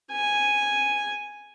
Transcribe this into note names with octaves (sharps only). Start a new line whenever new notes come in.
G#5